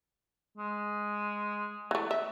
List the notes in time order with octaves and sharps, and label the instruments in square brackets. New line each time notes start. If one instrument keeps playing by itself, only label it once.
[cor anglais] G#3
[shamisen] E3 A3
E5